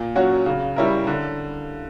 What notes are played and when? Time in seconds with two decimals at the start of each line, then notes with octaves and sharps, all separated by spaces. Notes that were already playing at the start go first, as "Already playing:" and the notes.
Already playing: A#2
0.16 F#3 C#4 F#4 C#5
0.46 C#3
0.76 G3 C#4 E4 A#4
1.07 D3